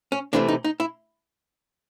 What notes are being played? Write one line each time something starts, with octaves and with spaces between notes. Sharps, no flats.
C#4
C3 E3 A3 D4
D#4
D#4
E4